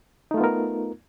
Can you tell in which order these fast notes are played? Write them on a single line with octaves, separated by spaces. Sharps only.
D#4 A3 F4 B3 A#4